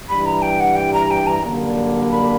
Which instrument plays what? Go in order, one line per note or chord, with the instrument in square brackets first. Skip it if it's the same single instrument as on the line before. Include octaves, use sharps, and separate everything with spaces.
[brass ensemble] G2 E3 G3 [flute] B5
[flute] A#5
G5
F#5
G5
A#5
G5
A#5
[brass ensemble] F#2 D3 G3 A#3
[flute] B5